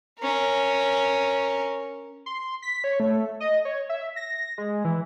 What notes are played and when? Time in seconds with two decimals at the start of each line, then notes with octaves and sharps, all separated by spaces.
0.19 C#4 A#4
2.26 C6
2.62 B6
2.84 C#5
3.00 A3
3.40 D#5
3.65 C#5
3.89 E5
4.16 A#6
4.58 G#3
4.85 E3